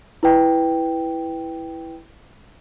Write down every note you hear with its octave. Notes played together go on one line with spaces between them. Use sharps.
E4 B4 G5